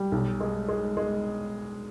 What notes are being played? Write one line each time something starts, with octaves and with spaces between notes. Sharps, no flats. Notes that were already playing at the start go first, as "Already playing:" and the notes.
Already playing: G3
B1
G#3
G#3
G#3